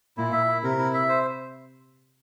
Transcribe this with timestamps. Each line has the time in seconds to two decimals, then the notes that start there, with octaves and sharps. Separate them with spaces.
0.17 A#2 E4
0.33 E5
0.48 E4
0.63 C3 A#4
0.79 E4
0.94 E5
1.09 C5